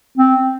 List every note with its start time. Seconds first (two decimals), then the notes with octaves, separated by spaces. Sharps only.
0.18 C4